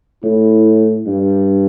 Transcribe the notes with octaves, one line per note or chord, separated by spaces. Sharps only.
A2 E4
G2